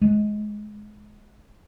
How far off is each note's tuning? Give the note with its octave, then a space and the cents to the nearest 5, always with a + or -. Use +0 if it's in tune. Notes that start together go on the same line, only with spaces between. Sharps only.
G#3 +20